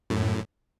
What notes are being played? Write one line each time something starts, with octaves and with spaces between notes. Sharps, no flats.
F#2 A2